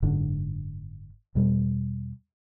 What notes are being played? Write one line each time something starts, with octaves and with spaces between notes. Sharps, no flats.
F#1 G#2 D3
E2 B2 G3